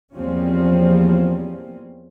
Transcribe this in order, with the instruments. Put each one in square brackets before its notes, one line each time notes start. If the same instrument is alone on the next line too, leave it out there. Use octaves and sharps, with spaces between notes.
[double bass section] E2 F3 G3 A#3 C4 C#4